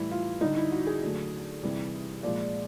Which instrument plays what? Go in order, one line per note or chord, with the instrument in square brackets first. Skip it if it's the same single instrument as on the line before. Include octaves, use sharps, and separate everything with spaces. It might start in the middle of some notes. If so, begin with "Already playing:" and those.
Already playing: [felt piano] A2 E3 G3 E4
F4
D3 G3 D#4
E4
F#4
G#4
D3 F#3 A3
C3 E3 G3
A#2 F3 G#3 D5